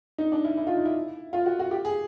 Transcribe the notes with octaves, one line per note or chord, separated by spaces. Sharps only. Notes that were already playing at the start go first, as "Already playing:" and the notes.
D#4
D4
E4
E4
F4
D#4
E4
F4
F#4
F#4
G4
G#4